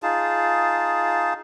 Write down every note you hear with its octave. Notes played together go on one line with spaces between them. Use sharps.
D#4 F4 G#4 A5